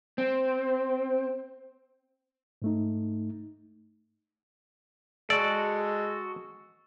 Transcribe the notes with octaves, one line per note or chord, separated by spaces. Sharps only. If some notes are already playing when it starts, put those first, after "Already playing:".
C4
G#2 A3 D#4
G#3 F#4 A4 D5